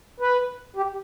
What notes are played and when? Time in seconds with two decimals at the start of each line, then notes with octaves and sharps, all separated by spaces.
0.20 B4
0.76 G4